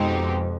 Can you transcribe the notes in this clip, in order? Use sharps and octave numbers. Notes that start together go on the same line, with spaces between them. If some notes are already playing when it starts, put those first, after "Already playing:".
Already playing: F2 B2 G#3 C4 D#4 G4